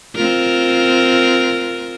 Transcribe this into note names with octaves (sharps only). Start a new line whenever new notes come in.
C4 F4 A#4